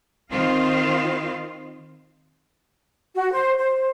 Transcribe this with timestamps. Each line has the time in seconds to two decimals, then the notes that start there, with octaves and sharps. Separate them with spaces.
0.31 D#3 C4 F4 F5
3.14 F#4
3.31 C5
3.57 C5